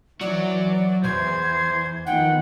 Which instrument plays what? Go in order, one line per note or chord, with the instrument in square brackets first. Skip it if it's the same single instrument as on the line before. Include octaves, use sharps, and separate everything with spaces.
[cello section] E3 [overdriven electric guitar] F#3 F#4 [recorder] D5
[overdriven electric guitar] B1 E2 [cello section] E3 [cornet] C5 [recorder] G#6
[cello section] D#3 F3 B3 [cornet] F#5 [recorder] G5